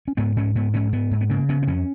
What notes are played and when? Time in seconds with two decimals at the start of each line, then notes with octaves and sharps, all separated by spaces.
0.08 C#4
0.17 G#2 B3
0.37 G#2 C#4
0.55 G#2 B3
0.74 G#2 C#4
0.93 G#2 B3
1.11 G#2
1.21 B3
1.30 C#3 A#3
1.49 C#3 B3
1.63 B3
1.67 F2 C#4